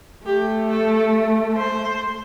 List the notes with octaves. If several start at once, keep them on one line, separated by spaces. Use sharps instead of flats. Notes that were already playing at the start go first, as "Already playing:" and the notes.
A3 G4
A4
C5